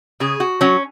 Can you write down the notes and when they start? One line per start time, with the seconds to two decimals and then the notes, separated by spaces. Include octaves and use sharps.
0.20 C#3 G#4
0.40 F#4
0.61 F#3 C#4